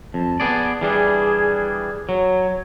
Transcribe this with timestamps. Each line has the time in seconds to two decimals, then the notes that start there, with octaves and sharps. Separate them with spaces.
0.14 F2 A5
0.40 B3 G#4 D5
0.81 E3 G3 D4 G#4
2.09 F#3 C#5